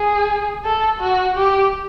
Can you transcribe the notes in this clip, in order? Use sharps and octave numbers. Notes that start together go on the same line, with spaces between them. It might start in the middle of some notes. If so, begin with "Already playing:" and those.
Already playing: G#4
A4
F#4
G4